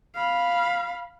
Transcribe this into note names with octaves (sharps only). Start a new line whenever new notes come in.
F5 B5